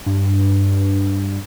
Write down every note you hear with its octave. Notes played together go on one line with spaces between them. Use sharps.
G2